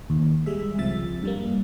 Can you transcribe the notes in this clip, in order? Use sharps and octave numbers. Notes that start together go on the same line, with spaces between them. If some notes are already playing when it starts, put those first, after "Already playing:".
D#2
G3 G#3 G#4 E5
C#2 C3 F3 E5 A6
G2 G3 A#3